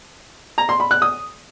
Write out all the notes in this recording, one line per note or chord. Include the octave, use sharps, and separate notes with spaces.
A#5
C6
B5
F#6
D#6